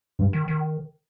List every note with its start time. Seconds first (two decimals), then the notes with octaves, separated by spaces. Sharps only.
0.19 G2
0.33 D#3
0.48 D#3